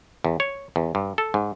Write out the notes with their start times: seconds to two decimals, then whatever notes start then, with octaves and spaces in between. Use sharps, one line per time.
0.24 E2
0.40 C#5
0.76 E2
0.95 G2
1.18 A4
1.34 G#2